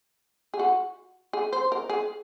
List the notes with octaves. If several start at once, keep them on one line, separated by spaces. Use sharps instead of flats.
G#4
F#4
G#4
C5
A#4
G#4